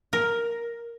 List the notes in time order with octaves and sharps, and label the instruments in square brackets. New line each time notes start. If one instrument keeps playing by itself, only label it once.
[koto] A#4